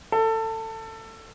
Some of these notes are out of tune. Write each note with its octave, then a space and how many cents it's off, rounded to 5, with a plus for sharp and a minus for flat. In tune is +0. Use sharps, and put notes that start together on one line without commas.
A4 +20